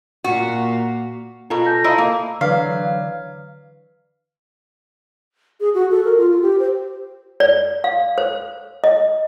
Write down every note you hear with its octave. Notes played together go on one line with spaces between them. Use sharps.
A#2 A#3 F#4
B2 F4 A4 G#5 A#5
A5 G6 A#6
E4 C5 D#5 F5 A#5
A#3
D3 E3 F#3 B4 D5 F5 B6
G#4
F#4
A4
A#4
F4
F4
G4
C5
D5
F5
C5
D#5